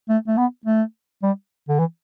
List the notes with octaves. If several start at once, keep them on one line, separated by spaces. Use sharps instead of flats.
A3
A3
B3
A3
G3
D3
E3